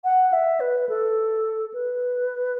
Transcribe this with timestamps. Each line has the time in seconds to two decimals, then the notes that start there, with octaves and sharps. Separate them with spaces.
0.04 F#5
0.33 E5
0.60 B4
0.89 A4
1.74 B4